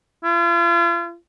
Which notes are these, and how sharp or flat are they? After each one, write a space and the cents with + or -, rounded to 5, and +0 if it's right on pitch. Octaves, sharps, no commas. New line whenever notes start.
F4 -40